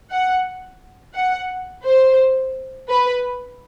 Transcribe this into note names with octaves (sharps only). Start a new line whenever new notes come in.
F#5
F#5
C5
B4